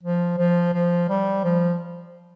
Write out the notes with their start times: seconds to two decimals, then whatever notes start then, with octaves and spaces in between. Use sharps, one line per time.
0.03 F3
0.38 F3
0.73 F3
1.09 G3
1.44 F3